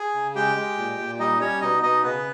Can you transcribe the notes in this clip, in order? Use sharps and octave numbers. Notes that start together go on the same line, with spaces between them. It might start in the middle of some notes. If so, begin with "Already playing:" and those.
Already playing: G#4 G#5
C#3
G#3 G4 G5
G#3
A#2
A#2
G3 D#4 D#5
G3 C#4 C#5
B2 D#4 D#5
B2 D#4 D#5
C#3 B3 B4